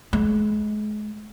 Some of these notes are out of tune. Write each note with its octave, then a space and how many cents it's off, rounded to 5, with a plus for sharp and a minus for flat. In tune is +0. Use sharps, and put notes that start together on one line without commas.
G#3 +35